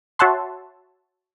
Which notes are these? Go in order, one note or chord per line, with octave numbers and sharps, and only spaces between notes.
F#4 C#5 E5 F#5 A5 C6